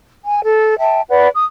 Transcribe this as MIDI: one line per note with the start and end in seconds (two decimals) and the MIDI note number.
0.25 0.39 80
0.44 0.78 69
0.80 1.01 76
0.80 1.01 79
0.80 1.01 81
1.09 1.28 71
1.09 1.28 74
1.09 1.28 78
1.35 1.44 87